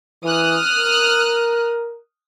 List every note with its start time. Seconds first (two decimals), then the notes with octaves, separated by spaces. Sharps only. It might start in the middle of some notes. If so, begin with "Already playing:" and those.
0.24 E3 D#6 F6 F#6
0.77 A#4